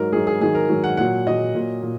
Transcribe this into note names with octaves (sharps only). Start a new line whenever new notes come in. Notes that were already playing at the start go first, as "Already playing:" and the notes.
Already playing: G#2 F#3 A#4
G#2 F#3 G#4
G#4
G#2 D#3 F#3 G#4
A#4
G#2 D#3 F#3
F#5
A#2 F#3 F#5
A#2 F#3 D#5
A#2 F#3
A#2